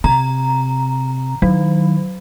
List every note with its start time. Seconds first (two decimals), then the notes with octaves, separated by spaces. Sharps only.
0.04 C3 A#5
1.42 D#3 F#3